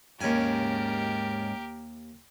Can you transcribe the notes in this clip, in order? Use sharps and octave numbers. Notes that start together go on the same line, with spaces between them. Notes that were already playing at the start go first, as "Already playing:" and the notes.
D#2 G#2 C#4 G4 A#4 G#5